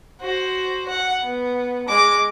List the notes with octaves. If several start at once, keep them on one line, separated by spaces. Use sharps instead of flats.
F#4 C5
F#5
B3
G#3 D6